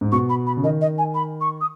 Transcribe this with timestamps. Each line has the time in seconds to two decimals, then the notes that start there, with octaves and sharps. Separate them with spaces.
0.01 G#2
0.12 B2 C#6
0.29 B5
0.46 B5
0.57 C#3
0.63 D#3 D#5
0.81 D#5
0.98 G#5
1.14 B5
1.40 C#6
1.61 D#6